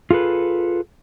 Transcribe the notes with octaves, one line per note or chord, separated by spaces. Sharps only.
F4 G#4 A4 B4